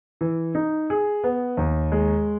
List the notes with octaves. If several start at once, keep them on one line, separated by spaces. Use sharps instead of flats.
E3
D#4
G#4
B3
D#2
G#3